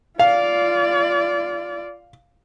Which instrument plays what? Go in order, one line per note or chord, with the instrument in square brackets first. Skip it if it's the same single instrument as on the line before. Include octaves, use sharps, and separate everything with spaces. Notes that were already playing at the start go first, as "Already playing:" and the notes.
[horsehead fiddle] F4 D5 [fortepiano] F5